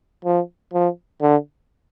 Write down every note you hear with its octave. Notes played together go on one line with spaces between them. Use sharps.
F3
F3
D3